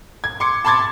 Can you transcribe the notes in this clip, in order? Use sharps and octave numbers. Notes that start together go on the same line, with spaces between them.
G#6
C6 D6 C#7
A5 B5 C6 D6 G#6 A6